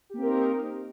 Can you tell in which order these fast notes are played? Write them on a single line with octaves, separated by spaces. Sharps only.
G4 A#3 C4 A#4 D#4